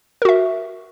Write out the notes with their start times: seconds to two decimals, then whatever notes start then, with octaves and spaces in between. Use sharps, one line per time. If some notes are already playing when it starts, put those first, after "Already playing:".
0.22 A#4
0.25 F#4
0.29 E5